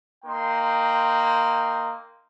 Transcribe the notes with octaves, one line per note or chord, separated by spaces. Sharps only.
A#3 D#4 G5 C6